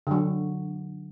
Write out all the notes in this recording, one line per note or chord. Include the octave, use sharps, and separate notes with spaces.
D3 F#3